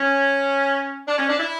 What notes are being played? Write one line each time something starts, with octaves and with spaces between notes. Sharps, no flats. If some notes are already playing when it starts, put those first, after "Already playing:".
Already playing: C#4
D4
C#4
D4
E4